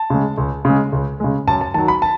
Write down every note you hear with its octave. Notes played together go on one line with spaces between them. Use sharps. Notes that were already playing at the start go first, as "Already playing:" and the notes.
Already playing: A5
C#3 G#3
C#2
C#3 G#3
C#2
C#3 G#3
F#2 A5
A5
D#3 F#3 A5
B5
A5